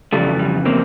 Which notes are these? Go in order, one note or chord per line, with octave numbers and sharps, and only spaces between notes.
F2 C#3 E3 G3 A3
G3
A#3 C4